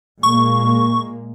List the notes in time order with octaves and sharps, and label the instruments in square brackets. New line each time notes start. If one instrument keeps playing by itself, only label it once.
[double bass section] A#2 G#3 A#3 [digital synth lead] C#6